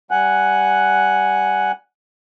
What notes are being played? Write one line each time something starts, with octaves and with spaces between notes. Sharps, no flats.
G3 F#5 G#5 F#6